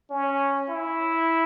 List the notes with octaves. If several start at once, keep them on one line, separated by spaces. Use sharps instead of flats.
C#4
E4